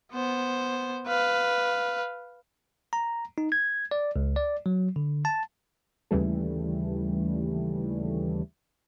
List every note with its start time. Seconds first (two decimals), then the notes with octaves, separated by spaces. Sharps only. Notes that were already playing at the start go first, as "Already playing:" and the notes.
0.12 B3 C5
1.07 B4 F5
2.93 A#5
3.38 D#4
3.52 G#6
3.91 D5
4.16 C#2
4.36 D5
4.66 F#3
4.96 D3
5.25 A5
6.11 D#2 C#3 E3 G3 A3